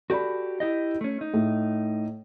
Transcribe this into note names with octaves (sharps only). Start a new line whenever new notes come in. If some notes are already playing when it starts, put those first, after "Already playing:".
F#4 G4 A4 D5 B5
E4 G4 D#5
A3 C#4
D#4
A2